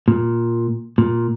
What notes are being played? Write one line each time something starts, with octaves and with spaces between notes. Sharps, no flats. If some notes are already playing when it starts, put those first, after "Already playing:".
A#2
A#2